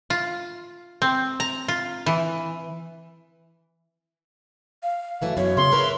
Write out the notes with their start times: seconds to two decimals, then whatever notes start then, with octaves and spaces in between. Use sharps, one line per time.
0.10 F4
1.02 C4
1.40 A#5
1.68 F4
2.06 E3
4.83 F5
5.22 F#2 E3 A3
5.37 F#2 B2 C#5
5.57 C#3 C6
5.72 E4 A#4 B4